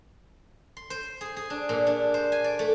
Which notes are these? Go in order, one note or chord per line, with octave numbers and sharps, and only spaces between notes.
C6
C5
G#4
G#4
D4
A#2
D4
C5
G#5
D5
A3